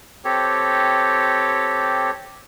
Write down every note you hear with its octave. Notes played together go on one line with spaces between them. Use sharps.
C4 G4 A4 C#5